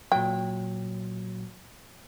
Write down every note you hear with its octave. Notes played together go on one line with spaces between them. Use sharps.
A#2 F#3 G5